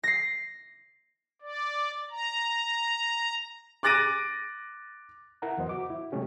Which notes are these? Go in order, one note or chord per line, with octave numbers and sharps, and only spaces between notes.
A#6 C7
D5
A#5
D6 F#6 A6 A#6 D7 D#7
E4 A#4 F#5 A#5
E2 E3 F#3 B3 C5 D#5
F#4 D6
E4
C3 F#3 G#3 A3 C#4 G4